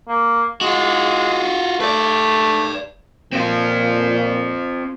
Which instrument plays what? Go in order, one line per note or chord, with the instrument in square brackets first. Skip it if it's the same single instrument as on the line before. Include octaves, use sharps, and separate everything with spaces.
[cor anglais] A#3
[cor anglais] G#3 [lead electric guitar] F4 F#4
[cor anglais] A3 [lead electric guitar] B4 D5
[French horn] A#2 [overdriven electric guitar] C4 F4